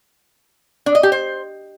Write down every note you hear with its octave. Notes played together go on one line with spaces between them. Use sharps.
D4
D#5
G4
C5